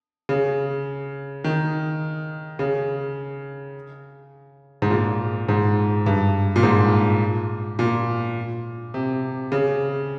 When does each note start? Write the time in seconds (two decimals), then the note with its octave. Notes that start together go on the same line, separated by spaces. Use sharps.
0.29 C#3
1.44 D#3
2.59 C#3
4.82 G#2
4.90 A#2
5.49 G#2
6.06 G2
6.56 A#2
6.63 G#2
7.79 A#2
8.94 C3
9.52 C#3